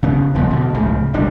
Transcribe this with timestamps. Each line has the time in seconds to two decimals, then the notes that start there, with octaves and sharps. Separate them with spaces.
0.03 C#3 B3
0.34 D#1 C2 F3 B3
0.50 B2 D3
0.74 C#2 A2 C#3 F3
1.14 E1 C#2 G3 D4